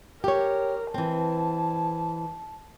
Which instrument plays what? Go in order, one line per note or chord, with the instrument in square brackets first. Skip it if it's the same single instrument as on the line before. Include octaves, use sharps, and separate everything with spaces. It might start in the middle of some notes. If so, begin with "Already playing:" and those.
[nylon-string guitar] G4 C#5 [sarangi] A#4
[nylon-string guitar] E3 C4 [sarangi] A5